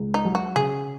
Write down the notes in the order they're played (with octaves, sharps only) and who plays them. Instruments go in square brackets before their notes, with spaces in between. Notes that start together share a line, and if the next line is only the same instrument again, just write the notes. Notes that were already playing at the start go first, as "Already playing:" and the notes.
Already playing: [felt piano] C#2
[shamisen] D#4
[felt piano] F#3
[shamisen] F#4
[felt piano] C#3 [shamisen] G#4